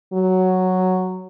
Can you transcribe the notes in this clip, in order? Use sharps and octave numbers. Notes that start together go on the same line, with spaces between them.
F#3